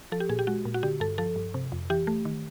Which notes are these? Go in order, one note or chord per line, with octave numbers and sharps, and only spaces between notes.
F3 A4
G4
A#2 G#4
G4
G#3 F#4
A#2
F#4
D3 G4
G2 A4
F3 A4
G2
C3
F2
E3 G4
A3
D#3